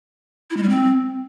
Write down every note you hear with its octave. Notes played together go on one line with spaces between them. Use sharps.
E4
G#3
G3
C4